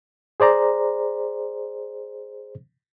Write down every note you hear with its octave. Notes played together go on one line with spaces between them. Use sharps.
G#4 C5 D5 A#5